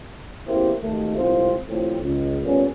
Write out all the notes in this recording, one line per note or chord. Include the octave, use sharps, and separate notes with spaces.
A1 E2 A#3 E4 G4 C5
G#1 D#2 A3
C2 G#2 C4 F4 C5
D#2 A2 F3 C4
C#2
A#2 G3 A3 B3 C#4